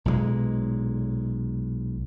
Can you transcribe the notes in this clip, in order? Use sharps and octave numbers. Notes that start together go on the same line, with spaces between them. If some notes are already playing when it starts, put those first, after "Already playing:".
B1 A#2 D3 G#3